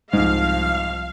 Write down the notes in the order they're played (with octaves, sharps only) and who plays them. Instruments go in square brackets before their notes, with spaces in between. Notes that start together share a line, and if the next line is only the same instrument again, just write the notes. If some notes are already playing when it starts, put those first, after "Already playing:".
[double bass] C2 F3 [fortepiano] G#2 [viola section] F5